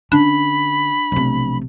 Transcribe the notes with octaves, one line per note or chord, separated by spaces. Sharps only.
D3 C#4 D4 B5
B1 C3 F3 A3